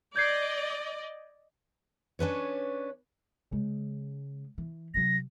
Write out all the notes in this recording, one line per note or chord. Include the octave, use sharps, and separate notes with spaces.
D5 D#5 G6 G#6 C7
C#4 D4 B4 C#5
C#3 G#3
E3
C3 F#3 A#6